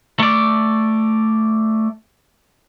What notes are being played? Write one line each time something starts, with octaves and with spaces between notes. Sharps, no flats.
A3 D5